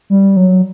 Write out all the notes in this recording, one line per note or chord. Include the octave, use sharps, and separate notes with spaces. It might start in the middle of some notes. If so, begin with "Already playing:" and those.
G3
F#3